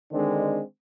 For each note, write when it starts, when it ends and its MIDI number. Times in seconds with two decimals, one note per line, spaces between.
0.11 0.61 50
0.11 0.61 51
0.11 0.61 56
0.11 0.61 60
0.11 0.61 62